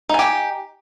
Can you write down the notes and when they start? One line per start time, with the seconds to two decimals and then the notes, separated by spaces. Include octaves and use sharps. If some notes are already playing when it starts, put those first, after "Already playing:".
0.09 D#4
0.14 G#5
0.19 G4